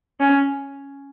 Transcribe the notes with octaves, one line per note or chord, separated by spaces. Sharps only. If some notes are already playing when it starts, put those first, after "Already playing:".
C#4